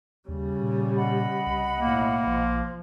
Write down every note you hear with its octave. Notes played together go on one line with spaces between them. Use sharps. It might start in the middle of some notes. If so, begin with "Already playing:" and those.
D#2 C#3 G3
A#2
D#5 F#5 B5
C2
B1 A2 A#3
A#1 F3